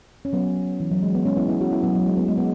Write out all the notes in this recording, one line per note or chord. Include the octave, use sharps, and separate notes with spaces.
C#4
F#3 B3
E3
F#3
G#3
B3
G#3 C#4
B3 E4
B3 E4
C#4 F#4
B3 E4
F#3 B3
F#3
G#3
B3
G#3
B3